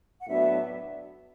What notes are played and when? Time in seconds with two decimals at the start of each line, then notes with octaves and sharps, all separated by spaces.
0.21 F#5
0.27 A2 F#3 B3 D4 F#4 E5